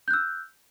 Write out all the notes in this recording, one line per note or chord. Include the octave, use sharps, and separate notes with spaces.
E6 F#6 G6